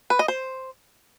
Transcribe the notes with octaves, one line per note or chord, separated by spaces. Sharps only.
B4
D#5
C5